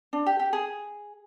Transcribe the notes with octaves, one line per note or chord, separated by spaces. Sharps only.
D4
G4
G4
G#4